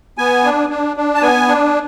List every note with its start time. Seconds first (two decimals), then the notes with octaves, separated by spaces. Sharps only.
0.18 B3 G#5
0.44 D4
0.70 D4
0.97 D4
1.14 A5
1.22 B3 G#5
1.48 D4